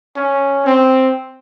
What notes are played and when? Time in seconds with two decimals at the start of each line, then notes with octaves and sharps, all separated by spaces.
0.16 C#4
0.66 C4